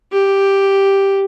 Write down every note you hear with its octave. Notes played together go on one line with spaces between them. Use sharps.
G4